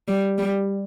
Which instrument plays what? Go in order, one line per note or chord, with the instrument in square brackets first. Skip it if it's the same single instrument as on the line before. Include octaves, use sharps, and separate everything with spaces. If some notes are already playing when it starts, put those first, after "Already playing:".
[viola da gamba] G3
G3